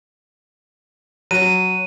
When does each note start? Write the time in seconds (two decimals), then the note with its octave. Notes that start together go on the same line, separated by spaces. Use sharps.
1.31 F#3 D#7